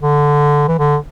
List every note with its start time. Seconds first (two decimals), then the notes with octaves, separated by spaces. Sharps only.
0.01 D3
0.68 E3
0.79 D3